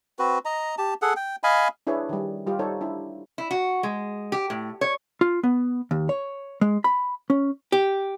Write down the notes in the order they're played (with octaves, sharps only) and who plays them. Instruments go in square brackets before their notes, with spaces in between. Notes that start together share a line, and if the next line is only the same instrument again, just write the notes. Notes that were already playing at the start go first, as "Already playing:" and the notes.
[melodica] C4 F#4 B4
D#5 A#5
G4 A5
G#4 A4 F#5
G5
D#5 F5 G#5 B5
[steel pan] D4 E4 G#4 B4 C#5
D#3 G3
G3 F4 G4
D#4 A4 C5 C#5
D4 E4
[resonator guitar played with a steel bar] E4
F#4
G#3
G4
A2
C#5
[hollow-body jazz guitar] F4
B3
D#2
C#5
G#3
B5
C#4
G4